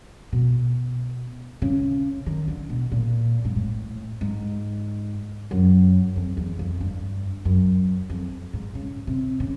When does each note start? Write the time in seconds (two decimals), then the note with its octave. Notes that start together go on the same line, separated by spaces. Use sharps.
0.32 B2
1.62 C#3
2.26 D#3
2.48 D3
2.70 B2
2.92 A#2
3.45 G#2
3.56 A2
4.21 G#2
5.51 F#2
6.16 F2
6.37 E2
6.59 F2
6.80 G2
7.45 F#2
8.10 F2
8.53 G#2
8.75 C#3
9.07 C3
9.40 C#3